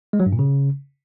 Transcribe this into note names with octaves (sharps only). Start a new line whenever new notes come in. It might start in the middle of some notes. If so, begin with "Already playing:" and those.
G#3
F#3
G2
A#2
C#3